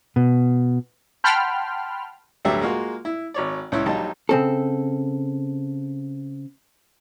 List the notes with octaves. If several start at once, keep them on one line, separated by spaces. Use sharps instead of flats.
B2
F#5 G5 A5 B5 C6 F6
D2 G2 D3 F#3 G3 E5
G#3 A#3 F4 F#4
E4
G#1 C#5 D5
C#2 C#4 E4
A#1 F#3 G3 D#4 A5
C#3 C4 A4